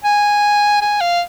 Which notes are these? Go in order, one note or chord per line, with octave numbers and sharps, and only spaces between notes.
G#5
G#5
F5